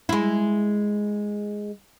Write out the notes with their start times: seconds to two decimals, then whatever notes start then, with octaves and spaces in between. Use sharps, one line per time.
0.09 G#3 E4